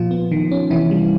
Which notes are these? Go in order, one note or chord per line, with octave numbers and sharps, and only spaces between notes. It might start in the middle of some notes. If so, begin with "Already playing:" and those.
Already playing: A#2 F3 F4
B3
D#3
C#4
C3 E3 E4
G3